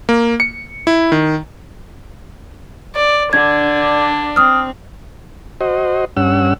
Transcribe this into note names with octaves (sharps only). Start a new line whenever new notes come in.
A#3
C#7
E4
D#3
D5
D3 D4 G#6
C4 D#6 F6
F#4 C5 D#5
G2 C#4 F#5 E6